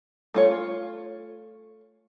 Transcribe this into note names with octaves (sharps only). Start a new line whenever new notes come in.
A3 F4 C#5